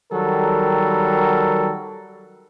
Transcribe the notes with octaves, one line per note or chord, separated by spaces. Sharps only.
D#3 F#3 G3 A4 A#4